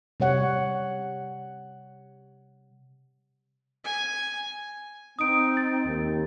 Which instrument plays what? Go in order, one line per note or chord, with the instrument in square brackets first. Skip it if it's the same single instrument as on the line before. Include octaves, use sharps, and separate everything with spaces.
[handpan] C3 G3 C#5 F#5
[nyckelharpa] G#5
[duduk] C4 [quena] D#4 [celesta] D#6 D7
[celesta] A6
[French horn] D#2